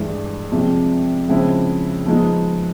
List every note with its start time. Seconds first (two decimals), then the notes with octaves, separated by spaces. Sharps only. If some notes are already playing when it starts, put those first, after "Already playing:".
Already playing: G2 E3 G#3
0.52 C3 F3 G#3
1.29 C#3 F3 G#3 C4 E4
2.06 F3 G#3 B3 D#4